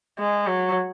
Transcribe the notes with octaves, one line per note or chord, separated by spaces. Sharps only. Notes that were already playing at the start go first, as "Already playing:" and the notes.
G#3
F#3